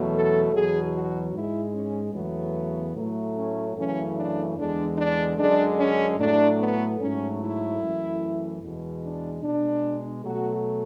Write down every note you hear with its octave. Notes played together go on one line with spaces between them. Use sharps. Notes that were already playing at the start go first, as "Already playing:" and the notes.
Already playing: E2 B2 F#3 A3
A4
E2 B2 F#3 G#4
F#4
G#2 G#3 E4
C#4
E2 C#3 F#3 A3 B3
A2 F#3 A3
C#4
F#2 C#3 E3 A3 C#4
D4
E2 D3 G#3 D4
D4
F#2 D3 G#3 D4
C#4
A2 F#3 A3 D4
B3
G#2 F#3 A3 C#4
E4
F#2 E3 A3
E2 B2 G#3
D4
B2 G#3 D4
B2 F#3 A3 F#4